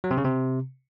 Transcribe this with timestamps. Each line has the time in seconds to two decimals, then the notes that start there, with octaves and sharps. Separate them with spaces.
0.04 F#3
0.11 C3
0.18 C#3
0.24 C3